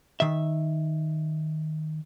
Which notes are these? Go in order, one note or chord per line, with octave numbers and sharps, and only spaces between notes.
D#3 E5